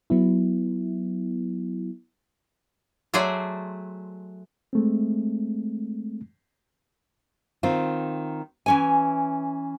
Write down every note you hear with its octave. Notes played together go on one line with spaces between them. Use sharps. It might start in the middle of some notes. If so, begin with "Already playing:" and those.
F#3 B3 E4
F#3 A3 G#4 C5 D5
G#3 A3 C4
D#3 C4 F4
E3 C#4 G#5